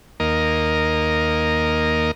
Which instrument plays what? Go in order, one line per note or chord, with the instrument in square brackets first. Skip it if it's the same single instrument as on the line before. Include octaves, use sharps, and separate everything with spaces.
[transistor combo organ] D#2 A#3 A#4 D#5